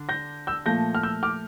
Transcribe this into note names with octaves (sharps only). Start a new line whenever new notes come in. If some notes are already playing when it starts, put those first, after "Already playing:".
Already playing: D3 D4
G6 A#6
E6 G6
A#2 F3 A3 G6 A#6
F6
E6 G6
D6 F6